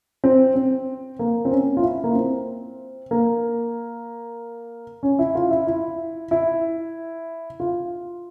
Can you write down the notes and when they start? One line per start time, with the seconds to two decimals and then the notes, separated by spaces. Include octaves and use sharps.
0.24 C4
0.56 C4
1.19 A#3
1.45 C4
1.51 C#4
1.77 F4
1.83 E4
2.04 A#3
2.15 C4
3.11 A#3
5.03 C#4
5.19 E4
5.35 F4
5.51 E4
5.67 E4
6.31 E4
7.60 F4